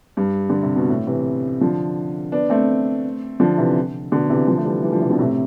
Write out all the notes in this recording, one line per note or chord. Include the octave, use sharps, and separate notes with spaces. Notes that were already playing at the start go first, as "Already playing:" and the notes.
G2
D3
C3
B2
A2
C3 E3
D3 F3
B3 D4
A3 C4
D3 F3
C3 E3
B2 D3
C3 E3
D3 F3
A3
E3 G3
E3 G3
D3 F3
C3 E3
B2 D3
A2 C3